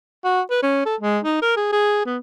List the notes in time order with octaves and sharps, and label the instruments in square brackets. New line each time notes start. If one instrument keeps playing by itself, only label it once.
[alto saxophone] F#4
B4
C#4
A4
G#3
D#4
A#4
G#4
G#4
B3